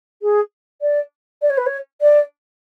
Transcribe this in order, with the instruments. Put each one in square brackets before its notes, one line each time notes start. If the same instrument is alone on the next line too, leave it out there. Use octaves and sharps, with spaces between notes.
[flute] G#4
D5
D5
C#5
B4
C#5
D5